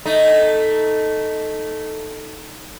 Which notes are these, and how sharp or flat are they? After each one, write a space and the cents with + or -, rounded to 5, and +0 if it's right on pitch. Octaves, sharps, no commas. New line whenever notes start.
A3 +0 D#4 +0